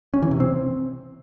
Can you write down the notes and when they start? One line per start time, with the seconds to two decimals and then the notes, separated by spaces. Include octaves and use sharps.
0.14 C#4
0.22 E3
0.31 C3
0.40 C4